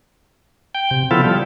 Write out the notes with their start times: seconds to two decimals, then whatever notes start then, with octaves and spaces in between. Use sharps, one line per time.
0.75 G5
0.91 C3
1.11 C#3 F3 B3 E4 F4 A4
1.24 G3